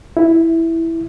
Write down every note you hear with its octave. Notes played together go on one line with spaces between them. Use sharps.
E4